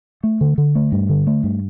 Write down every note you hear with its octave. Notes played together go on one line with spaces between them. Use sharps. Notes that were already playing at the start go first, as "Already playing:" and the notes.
A3
D3
D3
A3
G2
D3
A3
G2